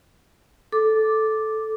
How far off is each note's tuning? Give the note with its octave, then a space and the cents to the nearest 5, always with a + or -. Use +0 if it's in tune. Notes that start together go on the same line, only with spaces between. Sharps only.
A4 -10 D6 +0